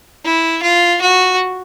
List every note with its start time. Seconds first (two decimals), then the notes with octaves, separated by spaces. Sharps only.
0.25 E4
0.63 F4
1.01 F#4